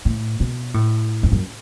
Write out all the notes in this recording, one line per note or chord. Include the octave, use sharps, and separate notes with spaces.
A2
B2
A2
F2
F#2